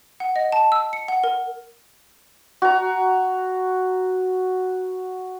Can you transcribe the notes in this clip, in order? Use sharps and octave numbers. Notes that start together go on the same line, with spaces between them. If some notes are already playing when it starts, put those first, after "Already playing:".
F#5
D#5
A5
E6
C#7
F#5
A#4
F#4 A#5